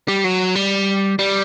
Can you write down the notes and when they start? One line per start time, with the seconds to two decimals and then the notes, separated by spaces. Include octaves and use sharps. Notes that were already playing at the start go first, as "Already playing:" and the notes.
0.08 G3
0.24 F#3
0.56 G3
1.19 G3